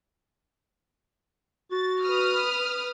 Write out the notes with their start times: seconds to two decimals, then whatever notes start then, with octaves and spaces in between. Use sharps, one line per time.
1.72 F#4 A6
2.03 B4 D#6 F6